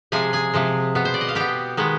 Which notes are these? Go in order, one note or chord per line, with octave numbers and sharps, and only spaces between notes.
C3 F3 G#3 G#4 G#5
G#4 G#5
C3 F3 G#3
B2 B3
C5
D5
D#5
F5
B2 B3 G4 G5
D#3 G#3 B3